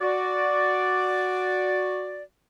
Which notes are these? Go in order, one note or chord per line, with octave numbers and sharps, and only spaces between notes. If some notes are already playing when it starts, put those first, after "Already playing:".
F#4 D5